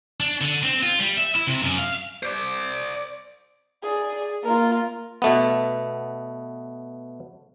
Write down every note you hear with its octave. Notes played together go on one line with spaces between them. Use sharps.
D4
D3
C4
F4
G3
E5
E4
C3
F#2
F5
C5 D5
G#4 D5
A#3 F4 A#4
B2 A3 B3